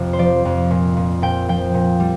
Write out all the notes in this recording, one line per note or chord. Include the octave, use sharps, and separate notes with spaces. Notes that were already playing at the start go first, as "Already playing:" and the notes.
Already playing: F2 C3
C5
F3 D5
F2
A#2
A#2
A#2 G5
F3 G5
A#2
G3